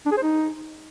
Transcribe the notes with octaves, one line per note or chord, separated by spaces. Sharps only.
D4
G#4
C5
D#4